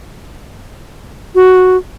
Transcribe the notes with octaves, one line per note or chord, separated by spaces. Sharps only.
F#4